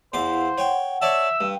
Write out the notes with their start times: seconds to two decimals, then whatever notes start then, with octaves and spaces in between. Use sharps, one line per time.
0.13 E2 E4 C5 F5 F#5 C6 D6
0.58 C#5 F#5 G5
1.02 C#5 D5 E5 A5 E6
1.41 G2 F5 G5